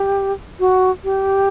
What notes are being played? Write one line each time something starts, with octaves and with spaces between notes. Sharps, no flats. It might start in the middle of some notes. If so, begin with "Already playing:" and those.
Already playing: G4
F#4
G4